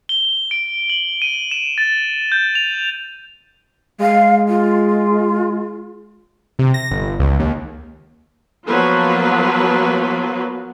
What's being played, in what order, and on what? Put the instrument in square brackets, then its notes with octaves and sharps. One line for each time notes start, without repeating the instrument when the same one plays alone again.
[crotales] G7
D7
F#7
D#7
E7
A6
G6
F7
[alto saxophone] G#3 [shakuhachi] F5
[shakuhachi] F4
[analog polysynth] C3
A#6
G1
C#2
D#2
[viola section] F3 F#3 A#3 B3 F4 B4